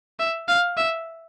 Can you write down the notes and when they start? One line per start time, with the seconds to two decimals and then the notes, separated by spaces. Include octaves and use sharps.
0.19 E5
0.48 F5
0.77 E5